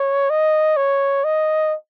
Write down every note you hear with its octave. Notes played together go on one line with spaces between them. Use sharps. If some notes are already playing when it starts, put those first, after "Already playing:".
Already playing: C#5
D#5
C#5
D#5